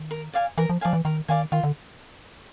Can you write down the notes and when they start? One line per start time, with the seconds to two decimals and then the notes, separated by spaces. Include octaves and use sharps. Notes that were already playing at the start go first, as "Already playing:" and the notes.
Already playing: D#3
0.11 A#4
0.33 D5 F5 G#5
0.58 E3 A#4
0.70 F3
0.81 F3 D5 F5 G#5
0.93 E3
1.05 D#3 A#4
1.28 D#3 D5 F5 G#5
1.52 D#3 F4
1.64 D3